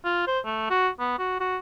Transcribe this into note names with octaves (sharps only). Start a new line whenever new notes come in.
F4
C5
A3
F#4
B3
F#4
F#4